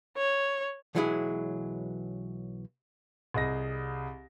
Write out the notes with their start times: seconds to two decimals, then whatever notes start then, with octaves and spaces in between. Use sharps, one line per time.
0.17 C#5
0.95 B1 E3 F#3 G#3 E4 G#4
3.34 C2 G#4 D#5 A#6